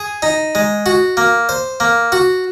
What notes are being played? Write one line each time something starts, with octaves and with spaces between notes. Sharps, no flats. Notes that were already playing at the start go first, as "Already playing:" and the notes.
Already playing: G#4
D#4
G#3
F#4
A#3
C5
A#3
F#4